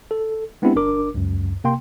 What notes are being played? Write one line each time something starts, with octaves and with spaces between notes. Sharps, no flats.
A4
G#3 B3 C4 D4 E4 G4
G1 D4 A#4 D6
C#2 F#2
C3 A#3 G5 C6